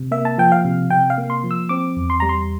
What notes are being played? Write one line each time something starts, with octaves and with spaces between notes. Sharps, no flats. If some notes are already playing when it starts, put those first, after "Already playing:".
Already playing: C3
A#3 E5
A5
F3 G5
F5
C3
C3 G5
F5
A#3
C6
F3
E6
C4 D6
E2
C6
G3 A#5
C6